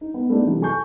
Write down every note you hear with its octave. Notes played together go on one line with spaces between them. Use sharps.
D#4
B3
A3 B3 D4 D#4 A4
C3 E3 F#3
A4 G#5 C#6 G6